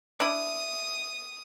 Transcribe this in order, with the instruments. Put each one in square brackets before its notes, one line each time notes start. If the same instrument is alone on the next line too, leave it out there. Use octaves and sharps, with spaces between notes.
[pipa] D4 E4 [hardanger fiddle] D#6